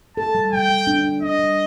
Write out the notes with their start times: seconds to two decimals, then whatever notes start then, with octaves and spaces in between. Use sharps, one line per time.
0.17 A4 A5
0.35 G3
0.52 G3 G5
0.69 G3
0.87 D4
1.05 D4
1.22 D4 D#5
1.39 G3